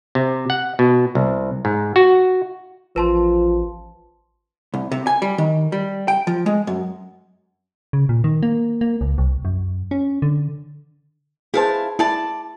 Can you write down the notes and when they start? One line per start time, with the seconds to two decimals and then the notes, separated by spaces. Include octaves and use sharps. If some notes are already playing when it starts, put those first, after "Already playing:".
0.15 C3
0.50 F#5
0.79 B2
1.15 C2
1.65 G#2
1.96 F#4
2.96 A1 F3 B4 A5 C6
4.74 C2
4.91 C3
5.07 G#5
5.22 G3
5.38 D#3
5.72 G3
6.08 G5
6.27 F3
6.46 G#3
6.67 F#2
7.93 C#3
8.09 A#2
8.24 D#3
8.43 A#3
8.81 A#3
9.01 C#2
9.18 C2
9.45 F#2
9.91 C#4
10.22 D3
11.54 E4 G#4 B4 C5 F5 A5
11.99 E4 D5 A5